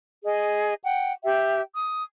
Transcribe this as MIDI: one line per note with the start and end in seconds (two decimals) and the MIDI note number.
0.24 0.73 68
0.24 0.73 75
0.83 1.11 78
0.83 1.11 79
1.23 1.61 67
1.23 1.61 76
1.23 1.61 79
1.74 2.02 87